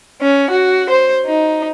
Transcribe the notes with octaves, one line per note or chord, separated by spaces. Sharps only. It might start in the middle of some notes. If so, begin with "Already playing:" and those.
C#4
F#4
C5
D#4